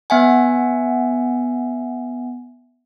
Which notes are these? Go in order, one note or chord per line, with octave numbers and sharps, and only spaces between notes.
B3 E5 F#5 G#5